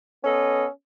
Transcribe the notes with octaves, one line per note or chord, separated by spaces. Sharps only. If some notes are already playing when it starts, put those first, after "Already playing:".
B3 C#4 A4 D#5